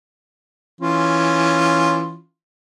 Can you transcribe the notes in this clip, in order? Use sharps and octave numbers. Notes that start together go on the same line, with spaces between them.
E3 C#4 F4